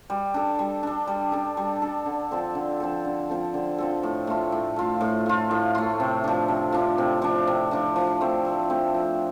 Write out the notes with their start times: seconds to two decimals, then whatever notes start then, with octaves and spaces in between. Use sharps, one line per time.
0.10 G3
0.34 D4 A4
0.59 G3
0.83 D4 A4
1.07 G3
1.32 D4 A4
1.57 G3
1.82 D4 A4
2.06 D3
2.31 F3 C4 A4
2.55 D3
2.80 F3 C4 A4
3.05 D3
3.30 F3 C4 A4
3.54 D3
3.78 F3 C4 A4
4.03 A2
4.27 A3 F4
4.52 A2
4.76 A3 F4
5.01 A2
5.26 A3 F4
5.51 A2
5.75 A3 F4
6.00 C3
6.24 F3 D4
6.48 C3
6.72 F3 D4
6.98 C3
7.22 F3 D4
7.47 C3
7.71 F3 D4
7.96 F3
8.21 A3 C4
8.45 F3
8.70 A3 C4
8.94 F3